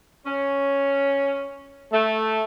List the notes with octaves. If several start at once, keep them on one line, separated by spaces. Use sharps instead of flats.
C#4
A3